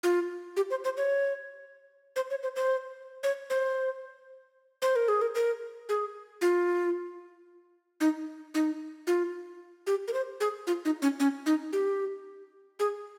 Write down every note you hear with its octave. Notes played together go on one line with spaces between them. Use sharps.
F4
G4
C5
C5
C#5
C5
C#5
C5
C5
C#5
C5
C5
A#4
G#4
A#4
A#4
G#4
F4
D#4
D#4
F4
G4
A#4
C5
G#4
F4
D#4
C#4
C#4
D#4
G4
G#4